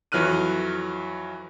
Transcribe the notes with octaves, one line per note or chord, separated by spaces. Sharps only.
F2 E3 F#3 F6 F#6 D#7